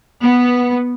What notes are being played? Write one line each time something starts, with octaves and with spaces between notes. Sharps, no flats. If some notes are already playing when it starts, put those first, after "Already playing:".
B3